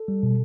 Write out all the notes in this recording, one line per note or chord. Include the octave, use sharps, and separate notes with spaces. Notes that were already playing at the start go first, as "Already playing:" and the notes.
Already playing: A4
G3
B2